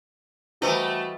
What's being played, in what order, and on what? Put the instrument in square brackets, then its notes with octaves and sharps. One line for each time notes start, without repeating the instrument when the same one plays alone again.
[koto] E3 G3 D#5 [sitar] A3 [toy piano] E4 C5 [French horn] F#4